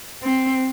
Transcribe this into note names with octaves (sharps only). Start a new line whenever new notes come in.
C4